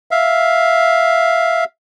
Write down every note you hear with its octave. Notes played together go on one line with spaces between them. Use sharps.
E5 F5